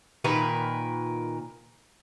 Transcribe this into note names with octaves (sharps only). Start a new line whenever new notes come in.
A#2 D#3 A#4 B4